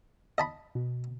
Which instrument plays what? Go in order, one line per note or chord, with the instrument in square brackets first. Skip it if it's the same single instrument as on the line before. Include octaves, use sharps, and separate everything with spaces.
[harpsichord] D#5 A5 B5
[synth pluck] B2